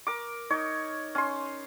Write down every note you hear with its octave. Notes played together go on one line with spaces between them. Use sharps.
A#4 D6
D#4 C#5
C#4 C6